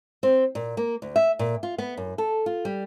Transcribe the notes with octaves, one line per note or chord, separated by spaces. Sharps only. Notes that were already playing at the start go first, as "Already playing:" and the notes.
C4
A#2
A#3
D2
E5
A#2
F4
B3
F#2
A4
F4
G3